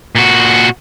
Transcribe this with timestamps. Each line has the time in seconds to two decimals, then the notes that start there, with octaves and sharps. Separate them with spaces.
0.15 A#2 F#4